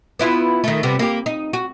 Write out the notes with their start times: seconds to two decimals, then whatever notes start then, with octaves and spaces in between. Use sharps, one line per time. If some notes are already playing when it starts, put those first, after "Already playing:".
0.19 B3 E4 F4
0.64 D#3 A3
0.83 C3 G3 B3
0.99 A#3 G4
1.26 D#4
1.53 F#4